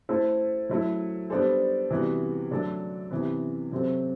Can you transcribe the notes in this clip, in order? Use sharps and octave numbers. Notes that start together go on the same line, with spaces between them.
A3 E4 A4 C5
F#3 A3 E4
G3 B3 D4 A4 C5
C3 E3 G3 B3 F#4
D3 F#3 A3 D4 A4
C3 E3 B3
C3 F#3 C4 F#4 A4